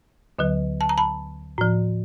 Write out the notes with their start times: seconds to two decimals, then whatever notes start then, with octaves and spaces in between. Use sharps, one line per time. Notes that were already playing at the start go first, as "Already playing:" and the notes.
0.39 D2 D3 F#3
0.81 A5
0.89 A#5
0.98 A5 B5
1.58 A2 F3